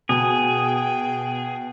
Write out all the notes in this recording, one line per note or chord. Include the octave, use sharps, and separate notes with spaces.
B2 G#4 G5